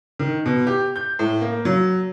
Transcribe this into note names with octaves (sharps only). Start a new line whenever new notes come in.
D#3
B2
G4
G6
A2
A#3
F#3